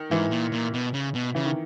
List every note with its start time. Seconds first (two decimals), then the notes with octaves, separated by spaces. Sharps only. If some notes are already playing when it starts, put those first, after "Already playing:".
Already playing: D#3
0.11 G#2 E3
0.31 A#2
0.53 A#2
0.74 B2
0.94 C#3
1.15 B2
1.35 C#3 E3
1.45 D#3